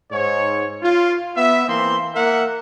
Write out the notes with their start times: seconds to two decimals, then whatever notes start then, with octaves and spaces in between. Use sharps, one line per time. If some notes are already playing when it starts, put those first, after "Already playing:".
0.11 G#2 C#5
0.82 F4
1.36 B3 E5
1.68 E3 A#3 C4 C6
2.14 A#3 A#4 E5 F#5